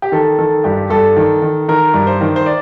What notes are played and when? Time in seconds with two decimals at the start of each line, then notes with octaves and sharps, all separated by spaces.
0.02 G4
0.12 D#3 A4
0.38 D#3 A4
0.64 G2 G4
0.90 G2 A4
1.16 D#3
1.42 D#3
1.68 D#3 A#4
1.94 G2
2.07 C5
2.21 D#3
2.36 C5
2.46 D5